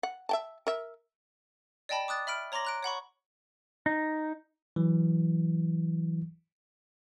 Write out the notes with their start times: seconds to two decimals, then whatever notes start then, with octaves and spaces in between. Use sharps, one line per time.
0.03 F#5
0.29 E5 G5 A5
0.67 A#4 E5
1.89 D5 D#5 G5 A5 B5
2.08 D6 D#6 F#6 A6
2.27 E5 B5 F6 D7
2.52 C#5 A#5 C6 D6 A#6 F#7
2.65 A#5 F#6 D7
2.83 C#5 F#5 B5 C#6
3.86 D#4
4.76 E3 F#3